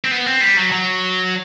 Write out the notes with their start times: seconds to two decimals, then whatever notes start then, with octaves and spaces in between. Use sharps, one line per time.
0.05 C4
0.11 B3
0.26 C4
0.41 G3
0.57 F#3
0.72 F#3